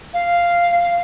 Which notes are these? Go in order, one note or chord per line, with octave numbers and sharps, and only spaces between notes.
F5